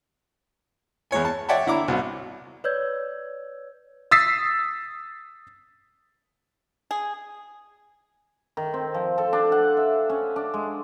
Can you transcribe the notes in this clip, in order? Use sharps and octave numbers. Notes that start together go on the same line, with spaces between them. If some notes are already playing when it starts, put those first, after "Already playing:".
E2 G#3 C#5 G#5
A5
C#5 D5 E5 F#5 G5 A5
D3 E4 A#5 D6
C2 B2
B4 C#5 D5 E6 G6 G#6
D#6 E6 A6 B6 C7
G#4
D#3
C4
F3
A4
D4
F#5
E5
C#4
D4
G#3